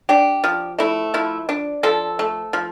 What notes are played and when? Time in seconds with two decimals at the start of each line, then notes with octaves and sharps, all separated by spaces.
0.09 D4 G4
0.44 F3
0.79 A3 E4
1.14 F3 E4
1.49 D4
1.83 F3 A4
2.19 A3
2.53 F3